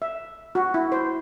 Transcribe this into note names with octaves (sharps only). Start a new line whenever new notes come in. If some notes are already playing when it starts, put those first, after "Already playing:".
E5
F#4
E4
C5